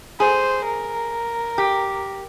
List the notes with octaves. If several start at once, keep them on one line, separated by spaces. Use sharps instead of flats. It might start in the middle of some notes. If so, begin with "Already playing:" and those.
G#4 C5
A#4
G4